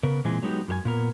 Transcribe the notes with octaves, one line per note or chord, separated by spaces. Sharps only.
C#3 B3 A#4
A#2 E3 G#3 C4 G#5
F#3 G#3 B3 D#4 G4
F#2 G4 G#5
A#2 B3 A#4